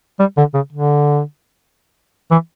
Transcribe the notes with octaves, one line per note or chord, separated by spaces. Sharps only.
G3
D3
C#3
D3
E3